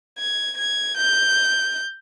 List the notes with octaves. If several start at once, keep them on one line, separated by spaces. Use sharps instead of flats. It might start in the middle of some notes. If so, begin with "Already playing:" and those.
G#6
G#6
G6